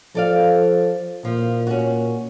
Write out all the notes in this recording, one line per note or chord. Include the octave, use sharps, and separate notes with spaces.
F3 A4 D5 F5
A#2 F3
C#4 F#4